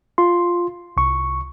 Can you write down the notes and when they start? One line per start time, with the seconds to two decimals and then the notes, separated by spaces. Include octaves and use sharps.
0.18 F4 C6
0.97 C2 C#6